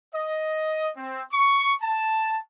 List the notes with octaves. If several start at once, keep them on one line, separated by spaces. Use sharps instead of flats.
D#5
C4
C#6
A5